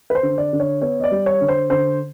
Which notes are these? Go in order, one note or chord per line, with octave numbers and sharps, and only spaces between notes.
B4
C5
D3
D5
D3
C#5
B3 C#5
D#5
D5
G3
C#5
D3
C5
D3 C5